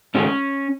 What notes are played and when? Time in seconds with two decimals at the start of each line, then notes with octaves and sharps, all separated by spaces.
0.14 G#2 D#3 G#3 C#4